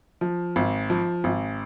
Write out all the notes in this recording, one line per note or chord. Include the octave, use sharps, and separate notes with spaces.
F3
G#1
F3
G#1